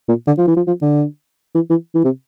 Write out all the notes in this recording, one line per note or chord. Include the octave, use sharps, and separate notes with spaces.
A#2
D3
F3
E3
F3
F3
D3
E3
E3
E3
C3